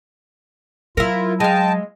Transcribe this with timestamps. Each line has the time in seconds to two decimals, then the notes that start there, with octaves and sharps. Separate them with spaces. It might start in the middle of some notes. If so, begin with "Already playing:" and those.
0.97 F#3 E4 F4 A#4
1.40 G#3 F5 G5 A5